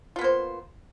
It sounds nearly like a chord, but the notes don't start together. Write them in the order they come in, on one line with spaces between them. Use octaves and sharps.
F4 B3 A#3 C5